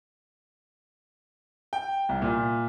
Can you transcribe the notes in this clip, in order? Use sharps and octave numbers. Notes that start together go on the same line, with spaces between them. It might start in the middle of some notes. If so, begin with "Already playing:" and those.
G5
C2
A#2